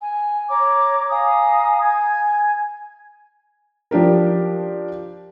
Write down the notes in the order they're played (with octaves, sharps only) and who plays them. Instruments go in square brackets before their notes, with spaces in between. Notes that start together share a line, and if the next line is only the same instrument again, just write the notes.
[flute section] G#5
C#5 A#5 D6
F5 G#5 A#5 D#6
G#5 G#6
[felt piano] F3 D4 G4 A#4